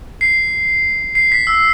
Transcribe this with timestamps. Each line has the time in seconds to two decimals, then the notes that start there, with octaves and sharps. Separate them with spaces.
0.21 C7
1.15 C7
1.32 B6
1.47 E6